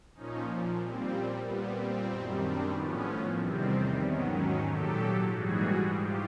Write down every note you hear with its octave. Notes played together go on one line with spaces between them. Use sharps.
A#2 F3 C#4 D#4
A#2 G3 C4
A#2 G3 B3
C4
F#2 D#3 G3
C4 D4
A2 F3 B3 C#4
E2 C3 D#3 G3 C4
G#2 D#3 F#3 B3 C#4
C#4 D#4
A#2 F#3 G4 A4
G#2 E3 G3 F#4 G#4
G#2 F4 G4